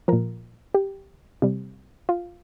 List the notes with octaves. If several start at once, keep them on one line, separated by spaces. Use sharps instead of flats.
A#2 F3 A#4
G4
C3 G3
F4